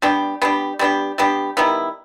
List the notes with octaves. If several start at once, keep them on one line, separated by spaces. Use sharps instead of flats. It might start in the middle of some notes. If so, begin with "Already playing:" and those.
G3 B3 D4 G4
G3 B3 D4 G4
G3 B3 D4 G4
G3 B3 D4 G4
D#3 G3 B3 E4